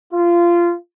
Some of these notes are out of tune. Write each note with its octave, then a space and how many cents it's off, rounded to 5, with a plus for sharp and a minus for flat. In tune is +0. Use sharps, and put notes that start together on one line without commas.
F4 -20